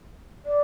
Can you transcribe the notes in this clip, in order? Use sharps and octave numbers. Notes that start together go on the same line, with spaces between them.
D5